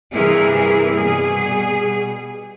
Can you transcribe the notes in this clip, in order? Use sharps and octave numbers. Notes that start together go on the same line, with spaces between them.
G2 C3 E3 E4 G#4 A#4
B2 G3 G#4